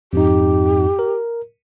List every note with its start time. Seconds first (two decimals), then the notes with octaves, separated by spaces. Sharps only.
0.13 F2 G#2 D#4 G4
0.99 A#4